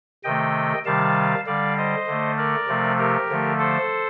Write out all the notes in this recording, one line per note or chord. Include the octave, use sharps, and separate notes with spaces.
C3 D#3 A3 D#5 G5
C3 D#3 G3 F5 A5
D3 G3 D5 F5
C5 D#5
D3 A3
A#4 D5
C3 F3 A3
G4 A#4
D3 F3 A3
A4 C5